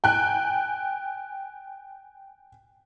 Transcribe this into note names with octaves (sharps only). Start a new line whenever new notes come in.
G5 G#5 F#6